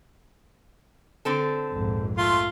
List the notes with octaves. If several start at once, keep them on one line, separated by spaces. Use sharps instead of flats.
D3 C4 A4
A#1 F2 G#2
A3 F4 C6